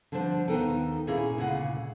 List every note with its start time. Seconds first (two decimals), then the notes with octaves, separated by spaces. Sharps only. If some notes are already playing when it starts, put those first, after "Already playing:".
0.12 D3 F3 G3 D4 C5
0.48 D#2 D#3 B3 D#4 A4 G5
1.07 A#2 A#3 C#4 E4 G#4 D#5
1.37 D2 A#2 C#3 F#5